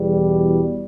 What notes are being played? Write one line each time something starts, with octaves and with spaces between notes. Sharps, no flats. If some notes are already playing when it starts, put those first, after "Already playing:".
Already playing: E2 B2 G3